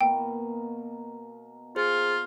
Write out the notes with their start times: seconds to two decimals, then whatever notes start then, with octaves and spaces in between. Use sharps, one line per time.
0.01 B2 A#3 G5
1.76 F4 G#4 C5